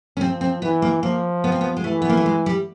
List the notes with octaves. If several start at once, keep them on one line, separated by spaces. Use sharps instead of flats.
C#4
F3 C4
C4
E3 B3
A#3
F3 A#3
B3
C4
B3
G#3
E3 A3
B3
A#3
A3
G#3
G3